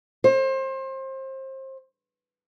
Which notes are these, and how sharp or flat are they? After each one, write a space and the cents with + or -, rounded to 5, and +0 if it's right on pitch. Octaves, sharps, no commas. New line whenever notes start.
C5 +30